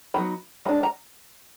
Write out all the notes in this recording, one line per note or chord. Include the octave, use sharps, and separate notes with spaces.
F#3 B3 D#4 B5
G#3 D4 B5
A#5